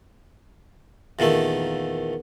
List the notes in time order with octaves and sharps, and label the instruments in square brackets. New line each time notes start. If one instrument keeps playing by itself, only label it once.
[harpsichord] E2 A#2 D#3 A3